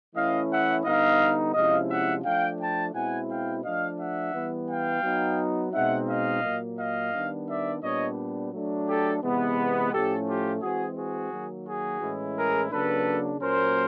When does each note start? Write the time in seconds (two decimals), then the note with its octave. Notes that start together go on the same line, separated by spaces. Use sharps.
0.15 E3 A3 C#4 E4 D#5 F5
0.50 E5 F#5
0.85 D3 G3 B3 D#4 D#5 F5
1.54 C3 F3 G#3 C#4 E4 D#5 F5
1.89 E5 F#5
2.24 F3 A3 D4 F5 G5
2.59 G5 A5
2.94 B2 G#3 C4 E4 F#5 G#5
3.29 F5 G5
3.64 F3 A3 D4 D#5 F5
3.99 E5 F#5
4.34 E3 G3 B3
4.69 F5 G5
5.03 F#3 B3 D#4
5.73 B2 G#3 C4 D#4 E5 F#5
6.08 D#5 F5
6.43 A#2 F#3 A#3
6.78 D#5 F5
7.14 D#3 G3 B3 D4
7.48 D5 E5
7.82 A#2 G3 B3 D4 C#5 D#5
8.53 F#3 A3 D4
8.87 G4 A4
9.22 C3 E3 G#3 B3
9.92 A2 F3 A3 C#4 G4 A4
10.27 F4 G4
10.62 E3 G#3 C4 F#4 G#4
10.97 F#4 G#4
11.31 D#3 F#3 A#3
11.67 F#4 G#4
12.01 A2 E3 G#3 C#4 E4
12.37 G#4 A#4
12.71 C#3 F#3 A#3 D4 A4 B4
13.41 A#2 F#3 A#3 C#4 A#4 C5